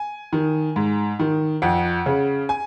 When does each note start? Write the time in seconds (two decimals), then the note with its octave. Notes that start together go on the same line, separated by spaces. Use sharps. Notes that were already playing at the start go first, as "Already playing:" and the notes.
Already playing: G#5
0.33 D#3
0.76 G#2
1.19 D#3
1.62 F2 F#5
2.06 C#3
2.49 G#5